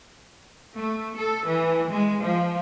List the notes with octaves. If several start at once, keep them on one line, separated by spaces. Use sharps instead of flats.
A3
A4
E3
G#3
F3